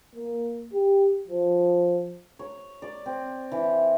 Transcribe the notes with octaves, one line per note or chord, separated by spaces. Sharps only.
A#3
G4
F3
C#5
D5
C4
E3